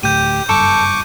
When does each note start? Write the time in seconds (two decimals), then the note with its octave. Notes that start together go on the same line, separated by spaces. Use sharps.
0.03 D2 A2 G4 G6 D#7
0.49 F#1 G2 A4 C#6 D6